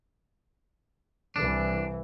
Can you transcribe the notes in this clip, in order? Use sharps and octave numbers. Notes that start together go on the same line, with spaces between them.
C2 E3 D4